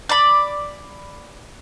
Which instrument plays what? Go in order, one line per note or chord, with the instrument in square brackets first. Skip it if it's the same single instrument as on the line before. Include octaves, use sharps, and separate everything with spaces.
[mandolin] D5 B5